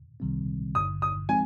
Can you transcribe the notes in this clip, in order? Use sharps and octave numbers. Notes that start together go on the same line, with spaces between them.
C2 C3 D#3 G3 C4
G#1 G2 D3 D#6
D#6
F3 G#3 C4 D#4 G#5